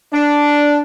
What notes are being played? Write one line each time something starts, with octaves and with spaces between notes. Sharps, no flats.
D4